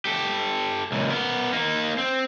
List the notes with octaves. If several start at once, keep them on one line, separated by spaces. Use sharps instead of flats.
G4 A4
C#2 A#2
B3 A#4
A#3 D#4
C4